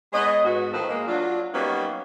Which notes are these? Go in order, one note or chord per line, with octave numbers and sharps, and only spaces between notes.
G#3 B3 C#5 D#5
G#2 B3 F#4
A2 D#3 F3 A4 B4 C5
G#3 A#3
F#3 D4 F4
F#3 G3 A#3 B3 C#4 D#4